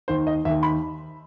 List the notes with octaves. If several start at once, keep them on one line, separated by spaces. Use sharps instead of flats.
D#2 D#3 C5
D#5
D#2 D#3 E5
B5